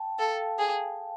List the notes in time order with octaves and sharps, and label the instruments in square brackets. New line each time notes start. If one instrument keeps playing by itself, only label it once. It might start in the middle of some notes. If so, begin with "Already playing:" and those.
Already playing: [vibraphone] G5 A5
[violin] A4 [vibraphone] F5 G5
[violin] G#4